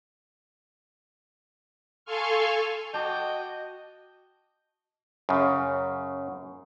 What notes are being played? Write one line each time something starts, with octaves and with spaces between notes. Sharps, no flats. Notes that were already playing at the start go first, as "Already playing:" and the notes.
A4 F5 G#5 C6 C#6 F6
F#4 D#5 G5 A5 D6
F#2 C#3